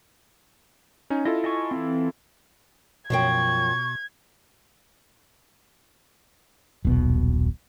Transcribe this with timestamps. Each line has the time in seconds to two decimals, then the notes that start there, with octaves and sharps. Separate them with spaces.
1.10 C#4 D#4 G#5
1.25 E4 F4 A4 D#5
1.44 D#5 G#5 C#6
1.71 E3 C4
3.10 F#2 B2 F3 G5 C#6 G#6
6.85 D#1 B1 B2